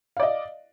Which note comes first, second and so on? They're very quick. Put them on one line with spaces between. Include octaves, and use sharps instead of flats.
F5 D5 D#5